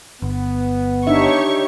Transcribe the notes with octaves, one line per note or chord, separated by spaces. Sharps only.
G1 B3
D4 D#4 G4 C#5 E5 C#6